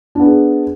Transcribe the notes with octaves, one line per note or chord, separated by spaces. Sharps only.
B3 D4 G#4